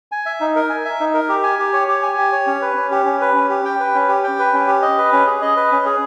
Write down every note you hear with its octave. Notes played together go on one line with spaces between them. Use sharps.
G#5
E5
D#4
A#4
G#5
E5
D#4
A#4
G4
G#5
G4
C#5
G4
G#5
G4
C#5
C#4
B4
C#4
G4
C#4
B4
C#4
G4
G5
B4
C#4
G4
G5
B4
C#4
G4
D#5
B4
C#4
G#4
D#5
B4
C#4
G#4